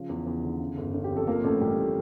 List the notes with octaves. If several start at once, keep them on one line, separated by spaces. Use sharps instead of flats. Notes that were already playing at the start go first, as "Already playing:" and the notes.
Already playing: C#3 F3
E2
E2
D3
C#3
G1
G1
G4
F2
A4
F3 A#3 A#4
A1 A3 A4
A1 G3 G4
A2